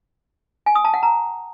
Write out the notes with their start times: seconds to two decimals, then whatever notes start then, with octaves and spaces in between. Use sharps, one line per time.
0.66 G#5
0.75 D#6
0.85 A5
0.94 F#5
1.03 A#5